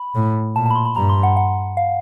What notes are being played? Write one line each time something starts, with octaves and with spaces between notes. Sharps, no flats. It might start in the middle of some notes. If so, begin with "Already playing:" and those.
Already playing: B5
A2
A#2 A5
A5 B5
C6
B5
G2 A#5
C6
F#5
F#5
F5